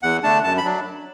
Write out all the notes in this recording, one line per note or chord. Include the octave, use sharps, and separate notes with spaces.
E2 F#5
D3 A3 D4 A5
F#2 A5
B5
F#3 D4